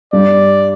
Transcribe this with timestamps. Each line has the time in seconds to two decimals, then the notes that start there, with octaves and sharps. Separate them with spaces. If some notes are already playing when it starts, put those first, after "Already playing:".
0.13 G2 D5